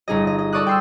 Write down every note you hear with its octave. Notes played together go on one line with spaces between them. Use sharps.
G1 D#4 G#4 D#5
D#5
D#5
A4 D5 C#6 D#6 F#6
G5 C6 E6